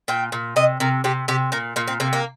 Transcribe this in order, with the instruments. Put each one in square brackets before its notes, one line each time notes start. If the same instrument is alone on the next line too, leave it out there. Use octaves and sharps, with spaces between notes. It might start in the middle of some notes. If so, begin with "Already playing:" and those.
[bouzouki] A#2 G5
A#2
C3 D#5
C3 A#4
C3 G4
C3 G4
A#2 A#4
A#2 A#3
C4
C3 A#3
A#3